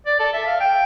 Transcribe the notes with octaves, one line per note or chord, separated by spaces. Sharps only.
D5
A4
E5
F5
G5